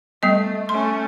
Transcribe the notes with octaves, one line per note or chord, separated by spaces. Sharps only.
G3 A3 B3 D#5
A3 C#4 C6